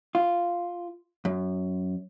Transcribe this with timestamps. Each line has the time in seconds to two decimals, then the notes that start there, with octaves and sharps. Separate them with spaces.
0.15 F4
1.25 F#2